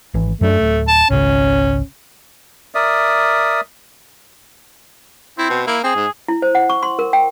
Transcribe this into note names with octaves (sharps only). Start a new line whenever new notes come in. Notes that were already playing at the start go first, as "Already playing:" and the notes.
G#1 E3
F#2 F#3 A3 D4
D1
A5
G#1 C#2 C#3 C#4
A#4 D5 E5 D#6
C4 E4
B2
A#3 E4
C4 G#4
G#2
E4
C5
F#5
C#6
C6
A#4
G5